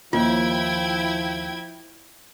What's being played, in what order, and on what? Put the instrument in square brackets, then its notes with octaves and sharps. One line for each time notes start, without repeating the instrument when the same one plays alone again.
[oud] D#2 [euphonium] F3 [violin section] E4 G5 G#6 [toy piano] F4